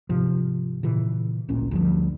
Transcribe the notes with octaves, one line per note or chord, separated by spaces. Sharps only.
G#2 C3 F3
A#2 C#3 E3
D1 A1 A#2 C#4
D2 G2 F3